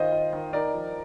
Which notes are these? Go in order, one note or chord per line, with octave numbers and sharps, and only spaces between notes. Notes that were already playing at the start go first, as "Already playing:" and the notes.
Already playing: D#3 F4 C5 D#5
F4
D#3
D#4 A#4 D5
F3